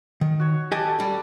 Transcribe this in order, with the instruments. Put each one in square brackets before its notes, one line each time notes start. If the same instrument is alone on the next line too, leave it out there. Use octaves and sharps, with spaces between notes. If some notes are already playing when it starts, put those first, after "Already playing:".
[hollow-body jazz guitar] D#3
[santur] F#4 C#5
[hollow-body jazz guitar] G4 D#5 G#5 [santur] D5 A5
[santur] A4
[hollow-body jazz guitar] G3